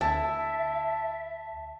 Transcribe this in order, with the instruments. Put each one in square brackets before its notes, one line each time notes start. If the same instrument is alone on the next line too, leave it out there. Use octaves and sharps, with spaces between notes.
[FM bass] D2 [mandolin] E4 [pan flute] E5 [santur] A5